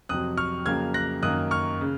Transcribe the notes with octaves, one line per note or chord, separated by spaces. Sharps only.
F2 C3 F#3 D#6 F#6
C#6 F6
F2 C#3 F#3 A#3 F6 G#6
F#6 A#6
F#2 D#3 A#3 D#6 F#6
C#6 F6
C#3